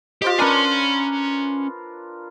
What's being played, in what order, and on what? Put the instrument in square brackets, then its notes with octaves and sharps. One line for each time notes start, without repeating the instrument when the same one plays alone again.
[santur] F4 C5 D#5 [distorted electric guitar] G4
[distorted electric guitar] C#4 G#5 [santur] D4 A#4 B4